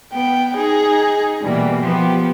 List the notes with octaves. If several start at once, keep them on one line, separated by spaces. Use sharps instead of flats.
B3 G5
D#4 G#4
B2 E3 G3 A#3
F3 B3 G4